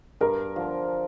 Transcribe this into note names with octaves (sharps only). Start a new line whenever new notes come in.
G2 A#4
D3 F3